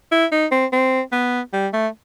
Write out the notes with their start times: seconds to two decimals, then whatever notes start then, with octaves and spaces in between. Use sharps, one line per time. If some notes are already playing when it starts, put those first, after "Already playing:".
0.12 E4
0.32 D#4
0.51 C4
0.73 C4
1.12 B3
1.53 G3
1.73 A3